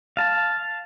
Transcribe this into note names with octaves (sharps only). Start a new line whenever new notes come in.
F5 A5